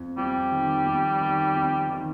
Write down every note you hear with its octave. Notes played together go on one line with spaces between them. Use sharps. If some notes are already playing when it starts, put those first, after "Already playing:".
Already playing: F2
F2 G3
D#3
F2
D#3
F2
D#3